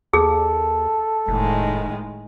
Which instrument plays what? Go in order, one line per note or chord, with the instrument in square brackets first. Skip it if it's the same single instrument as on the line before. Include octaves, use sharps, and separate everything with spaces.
[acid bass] D#2 [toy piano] G#4 [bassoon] A4
[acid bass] F1 [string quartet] A2 D#3 G#3